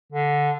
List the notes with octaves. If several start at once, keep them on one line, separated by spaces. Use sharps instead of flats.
D3